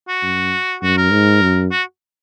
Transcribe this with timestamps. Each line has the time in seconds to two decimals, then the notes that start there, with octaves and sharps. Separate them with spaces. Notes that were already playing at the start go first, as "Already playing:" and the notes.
0.08 F#4
0.23 F#2
0.82 F#2 F#4
0.97 A#4
1.12 G#2
1.42 F#2
1.71 F#4